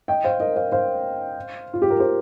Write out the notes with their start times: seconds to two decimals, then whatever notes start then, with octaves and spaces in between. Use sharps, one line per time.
0.08 D#5 G5
0.24 C5 F5
0.40 A#4 D#5
0.56 C5 F5
0.72 C5 F5
1.74 F4
1.82 G4
1.90 A#4
2.00 G4 C5